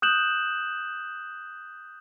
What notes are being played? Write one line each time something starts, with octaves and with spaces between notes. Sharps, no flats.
D#6 F#6 G6 E7 F#7